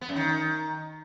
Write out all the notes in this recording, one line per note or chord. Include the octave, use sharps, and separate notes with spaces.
B3
F#2
D#3